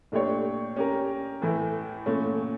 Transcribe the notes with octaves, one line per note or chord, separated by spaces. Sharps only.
A#2 A3 D4 G4 C#5
C#4 G4 A#4
A2 E3 A3 E4
A#2 A3 C#4